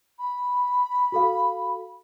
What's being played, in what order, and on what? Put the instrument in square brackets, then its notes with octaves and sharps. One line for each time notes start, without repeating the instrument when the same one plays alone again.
[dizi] B5
[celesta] F#4 A4 F5